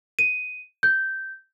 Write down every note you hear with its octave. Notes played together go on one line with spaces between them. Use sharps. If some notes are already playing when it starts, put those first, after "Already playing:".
D#7
G6